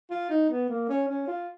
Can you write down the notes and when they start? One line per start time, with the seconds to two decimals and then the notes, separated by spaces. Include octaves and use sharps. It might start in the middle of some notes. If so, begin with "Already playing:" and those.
0.10 F4
0.30 D#4
0.50 B3
0.69 A#3
0.89 C#4
1.08 C#4
1.27 F4